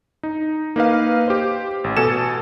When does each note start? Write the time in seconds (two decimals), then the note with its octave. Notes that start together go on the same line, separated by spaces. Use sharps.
0.23 D#4
0.76 A#3 D#4 B4 F5
1.28 G4 C5
1.84 A1
1.97 B2 A4 G#5 C#7 E7